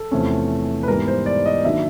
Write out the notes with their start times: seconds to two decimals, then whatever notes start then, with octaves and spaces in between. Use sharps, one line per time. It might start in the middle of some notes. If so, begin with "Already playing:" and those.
Already playing: A4
0.11 E2 C3 F3 A3 C#4
0.83 B4
0.87 G#2 E3 G3 B3 A#4
1.08 C5
1.26 D5
1.46 D#5
1.64 D#3 F#3 A#3 D4 E5